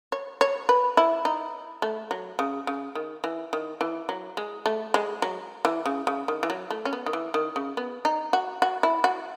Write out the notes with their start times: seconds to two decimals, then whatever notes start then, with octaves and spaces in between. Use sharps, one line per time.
0.12 C#5
0.41 C#5
0.69 B4
0.97 E4
1.25 D#4
1.82 A3
2.11 F#3
2.39 C#3
2.67 C#3
2.95 D#3
3.24 E3
3.53 D#3
3.81 E3
4.09 F#3
4.37 G#3
4.66 A3
4.94 G#3
5.22 F#3
5.65 E3
5.86 C#3
6.07 C#3
6.28 D#3
6.43 E3
6.50 F#3
6.71 A3
6.85 C#4
6.93 B3
7.06 D#3
7.13 E3
7.34 D#3
7.56 C#3
7.77 B3
8.05 D#4
8.33 F#4
8.62 F#4
8.83 E4
9.04 F#4